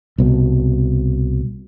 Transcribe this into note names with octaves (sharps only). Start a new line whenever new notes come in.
C2 B2